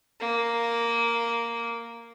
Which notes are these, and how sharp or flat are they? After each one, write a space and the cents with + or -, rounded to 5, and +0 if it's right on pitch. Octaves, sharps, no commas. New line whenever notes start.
A#3 +0